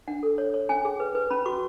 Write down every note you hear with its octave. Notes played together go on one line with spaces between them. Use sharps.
D4 F#5
A4
C#5
C#5
C#4 G#5
G#4
B4
B4
C#4 B5
F#4 C#6